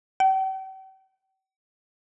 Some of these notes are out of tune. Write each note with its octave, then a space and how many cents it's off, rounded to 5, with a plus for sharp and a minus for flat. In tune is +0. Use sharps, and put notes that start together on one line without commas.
G5 -45